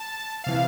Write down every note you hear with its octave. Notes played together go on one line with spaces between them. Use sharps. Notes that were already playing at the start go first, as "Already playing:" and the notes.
Already playing: A5
C3 E3 F5